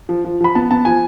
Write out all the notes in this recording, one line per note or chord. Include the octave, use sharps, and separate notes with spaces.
F3
F3
F3 B5
B3 A5
B3 A5
F3 G#5